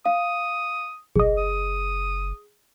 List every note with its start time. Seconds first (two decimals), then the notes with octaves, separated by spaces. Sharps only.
0.06 F5 D#6
1.16 F#1 B1 G#4 D#5
1.38 D#6